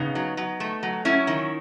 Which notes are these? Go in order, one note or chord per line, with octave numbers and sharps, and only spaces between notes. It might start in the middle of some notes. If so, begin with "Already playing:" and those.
Already playing: C#3 B3 D#4
F#3
F#3
A3
F#3
F#3 C#4 E4
D#3